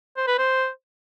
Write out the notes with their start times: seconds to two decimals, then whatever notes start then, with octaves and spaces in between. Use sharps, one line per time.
0.17 C5
0.28 B4
0.38 C5